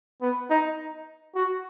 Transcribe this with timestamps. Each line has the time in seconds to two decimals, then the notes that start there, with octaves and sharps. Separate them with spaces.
0.22 B3
0.50 D#4
1.35 F#4